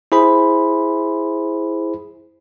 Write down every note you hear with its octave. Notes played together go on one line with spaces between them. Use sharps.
E4 G#4 C5 B5